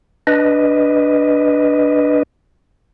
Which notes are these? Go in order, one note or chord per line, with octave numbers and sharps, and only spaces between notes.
D4 B4 D#5